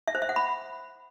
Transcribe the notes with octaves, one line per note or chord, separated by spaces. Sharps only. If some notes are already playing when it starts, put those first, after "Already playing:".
E5
C5
E5
F#5
B5